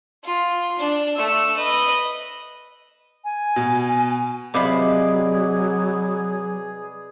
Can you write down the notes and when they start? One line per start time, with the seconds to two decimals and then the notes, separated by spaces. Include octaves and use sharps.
0.24 F4
0.79 D4
1.16 A3 E6
1.57 B4 D#5
3.25 G#5
3.56 B2
4.54 C3 F#3 F4 G#4 B4 D5 D#5 B5